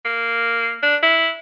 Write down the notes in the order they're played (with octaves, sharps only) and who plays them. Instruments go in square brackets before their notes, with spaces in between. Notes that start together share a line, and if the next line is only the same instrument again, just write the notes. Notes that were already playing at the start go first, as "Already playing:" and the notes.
[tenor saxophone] A#3
D4
E4